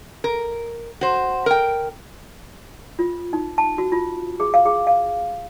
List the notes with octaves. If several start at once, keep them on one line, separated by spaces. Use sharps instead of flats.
A#4
F#4 C5
A#4 G5
F4
D#4
A5
F#4
F4
G#4
F5
G#4
F5